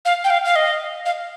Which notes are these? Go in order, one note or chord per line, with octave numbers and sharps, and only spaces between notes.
F5
G5
F5
F5
D#5
F5